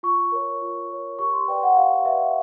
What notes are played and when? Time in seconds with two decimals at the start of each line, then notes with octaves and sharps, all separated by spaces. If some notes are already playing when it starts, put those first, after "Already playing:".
0.03 F4 C#6
0.32 A#4 C#5
0.62 F4
0.90 A#4 C#5
1.19 G4 C#6
1.33 C6
1.48 B4 D5 G5
1.63 F#5
1.77 G4 F5
2.05 B4 D5 E5